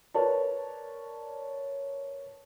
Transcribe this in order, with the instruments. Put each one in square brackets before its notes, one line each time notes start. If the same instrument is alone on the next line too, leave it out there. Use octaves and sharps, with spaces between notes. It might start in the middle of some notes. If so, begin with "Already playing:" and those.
[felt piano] A#4 B4 C#5 D5 A5